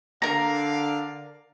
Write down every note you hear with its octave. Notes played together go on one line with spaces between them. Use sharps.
D3 A#4 D5 F5 A#5